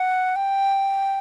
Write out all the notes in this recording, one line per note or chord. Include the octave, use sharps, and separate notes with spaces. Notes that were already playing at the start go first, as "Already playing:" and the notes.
Already playing: F#5
G5